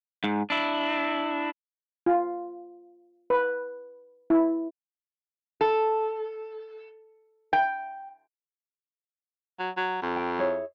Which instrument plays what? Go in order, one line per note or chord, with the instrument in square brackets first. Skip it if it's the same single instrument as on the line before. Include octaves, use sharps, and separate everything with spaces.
[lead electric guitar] G#2
D4 E4
[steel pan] F4
B4
E4
[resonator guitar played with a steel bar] A4
G5
[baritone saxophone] F#3
F#3
F2
[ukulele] G5
E4 G#4 C#5